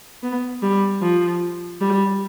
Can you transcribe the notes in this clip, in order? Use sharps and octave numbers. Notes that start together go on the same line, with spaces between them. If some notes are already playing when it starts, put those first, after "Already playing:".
B3
G3
F3
G3